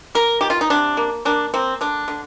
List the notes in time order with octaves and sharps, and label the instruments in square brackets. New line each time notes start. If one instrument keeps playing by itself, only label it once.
[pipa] A#3 A#4
D#3 G4
F4
D#4
C3 D4
A#3
A#3 D4
A#3 C4
D3 D4
D3